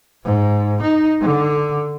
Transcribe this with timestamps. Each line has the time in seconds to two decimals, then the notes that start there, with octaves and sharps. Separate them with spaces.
0.24 G#2
0.81 D#4
1.21 D3